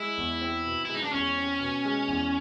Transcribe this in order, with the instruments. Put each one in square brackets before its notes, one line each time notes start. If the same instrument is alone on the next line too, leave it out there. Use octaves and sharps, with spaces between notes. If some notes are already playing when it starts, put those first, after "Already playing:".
Already playing: [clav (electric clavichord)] G#3 [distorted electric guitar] E4
[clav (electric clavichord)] E2
C4
B2
[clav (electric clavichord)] G#3 [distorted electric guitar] E4
[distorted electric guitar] D#4
D4
[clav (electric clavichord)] E2 [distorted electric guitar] C#4
[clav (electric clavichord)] C4
B2
G#3
E2